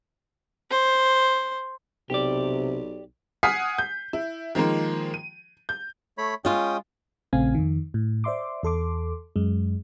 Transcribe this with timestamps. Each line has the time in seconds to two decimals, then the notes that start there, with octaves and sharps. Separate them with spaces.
0.71 C5
2.10 B1 C3 G4 D5
3.43 F#5 G#5 D#6 F6 B6 C7
3.79 G6
4.13 E4
4.55 D#3 F3 G#3 A#3
5.14 D#7
5.69 G6
6.18 A3 C#5 B5
6.45 G#3 C#4 F4 G5 D#6
7.33 A#1 C#3 A3 C4 F5 G#5
7.55 F2 D#3
7.94 A2
8.24 C5 D5 E5 C6 D6
8.63 E2 A4 C6 D6
9.36 F#2 G#3